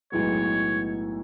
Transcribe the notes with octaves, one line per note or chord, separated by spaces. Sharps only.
B1 A2 G#3 B3 C#5